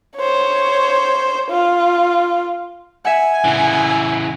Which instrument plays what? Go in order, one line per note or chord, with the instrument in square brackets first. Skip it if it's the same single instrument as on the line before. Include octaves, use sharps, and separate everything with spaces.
[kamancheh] C5 C#5
F4
[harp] E5 F#5 [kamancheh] G#5
[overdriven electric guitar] C#3 E3